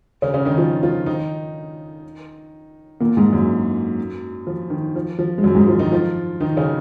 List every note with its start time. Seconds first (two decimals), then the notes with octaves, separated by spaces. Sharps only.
0.22 C#3 C#4
0.34 C#3 C#4
0.45 D#3 D#4
0.58 F3 F4
0.83 F3 F4
1.06 D#3 D#4
3.00 A#2 A#3
3.17 G#2 G#3
3.33 F#2 F#3
4.47 F3
4.70 D#3
4.96 F3
5.19 F3
5.38 G#3
5.43 F#2 F#3
5.55 G#2 G#3
5.68 F3 F4
5.79 D#3 D#4
5.92 F3 F4
6.40 D#3 D#4
6.57 C#3 C#4